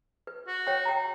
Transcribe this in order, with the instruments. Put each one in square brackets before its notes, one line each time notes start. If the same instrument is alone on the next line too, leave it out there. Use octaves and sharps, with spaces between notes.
[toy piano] B4
[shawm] F#4
[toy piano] C#5 G5
G5 A#5